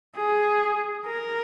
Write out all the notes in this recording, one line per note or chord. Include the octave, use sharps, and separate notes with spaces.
G#4
A#4